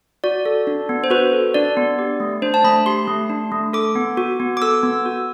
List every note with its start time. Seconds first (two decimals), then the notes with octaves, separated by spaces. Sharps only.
0.24 F#4 D5
0.45 A4
0.67 D4
0.89 B3
1.04 C5
1.10 F#4 B4
1.33 A4
1.54 D4 D5
1.77 B3
1.99 G4
2.20 A3
2.42 D4 C5
2.54 A5
2.64 A3 B5
2.86 G4 C6
3.08 A3
3.30 D4
3.52 A3
3.73 A4 D6
3.95 B3
4.17 F#4
4.40 B3
4.57 D6
4.62 A4 E6
4.83 B3
5.06 F#4